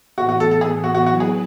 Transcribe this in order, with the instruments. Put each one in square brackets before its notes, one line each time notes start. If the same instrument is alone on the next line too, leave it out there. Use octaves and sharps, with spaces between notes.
[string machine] A2 E3 B3 [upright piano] F#4
[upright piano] F#4
A4
A4
G#4
F#4
F#4
[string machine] F#3 B3 E4 B4 [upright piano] F#4
[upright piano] G#4